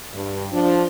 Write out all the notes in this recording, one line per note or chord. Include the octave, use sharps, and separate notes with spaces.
G2
F3 D4